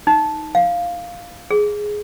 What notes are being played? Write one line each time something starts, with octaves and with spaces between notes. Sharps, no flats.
D#4
F5
G#4